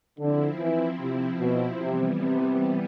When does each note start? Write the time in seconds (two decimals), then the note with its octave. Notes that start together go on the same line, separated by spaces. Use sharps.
0.19 D3 F3 C4 E4
0.60 E3
0.99 C3 F3 C4 E4
1.39 B2
1.79 C3 E3 G3 B3
2.19 C3